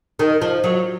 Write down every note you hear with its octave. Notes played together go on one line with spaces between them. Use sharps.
D#3
F3
F#3